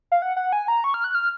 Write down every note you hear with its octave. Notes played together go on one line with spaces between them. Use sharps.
F5
F#5
F#5
G#5
A#5
C#6
F6
F#6
F6